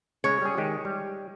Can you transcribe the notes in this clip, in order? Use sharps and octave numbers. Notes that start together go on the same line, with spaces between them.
C#3 G#3 C#5
G3 G#4
D#3 G#3 G4
G3